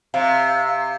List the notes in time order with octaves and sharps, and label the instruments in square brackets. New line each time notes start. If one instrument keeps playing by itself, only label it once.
[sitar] C3 [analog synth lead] F5